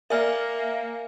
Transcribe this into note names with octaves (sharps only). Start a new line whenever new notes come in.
A#3 A#4 D5 E5 G#5 F6